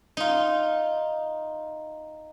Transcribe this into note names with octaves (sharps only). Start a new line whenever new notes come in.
D#4 F4